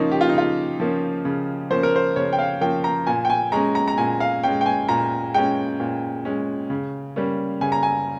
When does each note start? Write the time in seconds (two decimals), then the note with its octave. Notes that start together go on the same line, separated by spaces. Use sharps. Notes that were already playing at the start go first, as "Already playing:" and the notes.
Already playing: C#3 F3 A#3 C#4 D#4 F4
0.11 G4
0.21 F4
0.29 D#4
0.34 C#3 F4
0.80 F3 A#3 C#4
1.25 C#3
1.70 F3 A#3 C#4 C5
1.83 A#4
1.96 C5
2.16 C#3 C#5
2.33 G5
2.39 F5
2.61 F3 A#3 C#4 G5
2.84 A#5
3.07 A#2 G#5
3.25 G5
3.30 G#5
3.52 G#3 C#4 A#5
3.75 A#5
3.88 A#5
3.98 A#2 G#5
4.20 F5
4.43 G#3 C#4 G5
4.61 G5
4.66 G#5
4.89 A#2 A#5
5.34 G#3 C#4 G5
5.80 A#2
6.25 G#3 C#4
6.70 C#3
7.16 G3 A#3 C#4
7.61 C#3 G#5
7.72 A#5
7.83 G#5